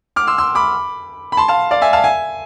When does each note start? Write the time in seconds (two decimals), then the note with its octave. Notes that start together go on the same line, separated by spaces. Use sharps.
0.16 D6 F6
0.27 C6 E6
0.38 C6 E6
0.55 B5 D6
1.32 B5
1.37 A5 C6
1.48 F5 A5
1.71 D5 F5
1.82 E5 G#5
1.93 F5 A5
2.04 E5 G#5